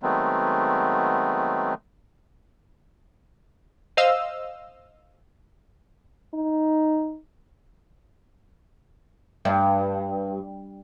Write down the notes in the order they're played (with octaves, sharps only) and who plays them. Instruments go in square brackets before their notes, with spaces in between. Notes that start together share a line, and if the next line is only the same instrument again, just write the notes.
[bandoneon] D#3 F#3 G#3 A3 B3 C4
[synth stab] C5 D#5 F5 E6
[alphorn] D#4
[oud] G2